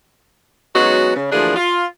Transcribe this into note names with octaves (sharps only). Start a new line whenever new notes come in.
F#3 G#3 B3 C#4 D#4 F#4
C#3
D2 E3 F3 A#3 D4 G#4
F4